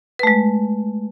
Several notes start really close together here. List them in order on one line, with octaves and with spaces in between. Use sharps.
B4 A3 G#3